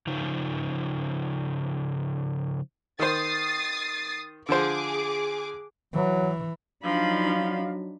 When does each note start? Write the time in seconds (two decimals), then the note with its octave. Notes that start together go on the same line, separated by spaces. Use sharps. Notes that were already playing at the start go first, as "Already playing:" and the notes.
0.07 C#3 F3 D#4
2.99 D#3 C5 D#6 A6 C7
4.49 D3 F3 G#4 C5 D6
5.94 E3 F#3
6.83 F3 F#3 D4 D#4 F5 B5